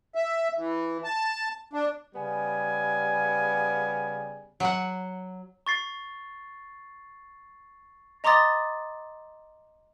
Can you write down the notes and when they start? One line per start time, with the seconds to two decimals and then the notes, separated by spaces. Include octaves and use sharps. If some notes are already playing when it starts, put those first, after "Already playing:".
0.15 E5
0.57 E3
1.04 A5
1.73 D4
2.15 C#3 G3 B3 G#5
4.60 F#3 F#5
5.67 C#6 A6 C7
8.24 D#5 A#5 C6 D6 D#6 A6